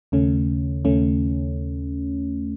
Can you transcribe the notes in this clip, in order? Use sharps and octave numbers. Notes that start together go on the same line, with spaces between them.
D#2 C#3 A3 C#4
D#2 C#3 A3 C#4